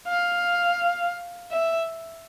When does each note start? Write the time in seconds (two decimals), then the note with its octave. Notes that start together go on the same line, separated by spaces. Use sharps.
0.08 F5
1.51 E5